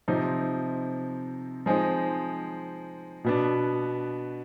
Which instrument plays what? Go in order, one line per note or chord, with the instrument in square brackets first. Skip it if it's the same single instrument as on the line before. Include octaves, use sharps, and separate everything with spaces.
[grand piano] C3 F3 C4 D#4
F3 G#3 C4 D#4
B2 B3 D4